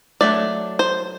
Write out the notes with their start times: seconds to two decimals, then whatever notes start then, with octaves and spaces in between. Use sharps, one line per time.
0.21 F#3 A3 D4 D5
0.79 C5